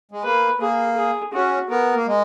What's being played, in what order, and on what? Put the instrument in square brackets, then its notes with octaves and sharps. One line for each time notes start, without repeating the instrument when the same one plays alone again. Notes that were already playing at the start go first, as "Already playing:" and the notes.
[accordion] G#3
[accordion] A#3 [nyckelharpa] B4
[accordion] A#3 [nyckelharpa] G#4
[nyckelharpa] G#4
[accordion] C#4 [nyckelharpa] F#4
[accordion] B3 [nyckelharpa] A#4
[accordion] A#3
G#3